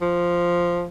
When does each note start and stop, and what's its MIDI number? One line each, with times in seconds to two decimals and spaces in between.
0.02 0.87 53